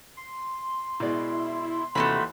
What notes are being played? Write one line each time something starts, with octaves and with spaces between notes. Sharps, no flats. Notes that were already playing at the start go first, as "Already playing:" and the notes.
C6
B2 G#3 E4 D5
D#2 C3 E3 A3 F#4 A4 B5